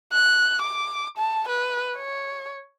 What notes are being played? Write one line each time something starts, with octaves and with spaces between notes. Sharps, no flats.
F#6
D6
A5
B4
C#5